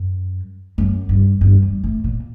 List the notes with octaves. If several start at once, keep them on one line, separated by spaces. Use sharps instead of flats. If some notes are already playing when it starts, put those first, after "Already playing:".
Already playing: F#2
F#2
G2
G2
G2
A2
A#2